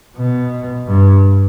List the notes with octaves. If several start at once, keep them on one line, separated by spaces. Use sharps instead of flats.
B2
G2